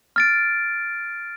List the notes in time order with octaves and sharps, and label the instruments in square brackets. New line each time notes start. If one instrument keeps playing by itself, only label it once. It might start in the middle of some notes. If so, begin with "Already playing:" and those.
[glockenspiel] F6 A6 D7